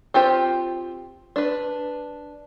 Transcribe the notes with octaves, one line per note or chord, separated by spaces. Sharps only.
C4 F4 G4 C5
D4 B4